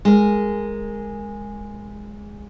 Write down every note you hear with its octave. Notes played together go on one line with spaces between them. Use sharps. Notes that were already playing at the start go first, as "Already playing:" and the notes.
G#3 A#4